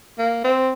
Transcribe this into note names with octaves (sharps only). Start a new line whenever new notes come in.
A#3
C4